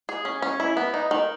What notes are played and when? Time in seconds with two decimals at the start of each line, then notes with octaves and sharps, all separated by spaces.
0.09 G#4
0.25 C#4
0.42 C#4
0.60 E4
0.77 B3
0.94 D#4
1.11 D#3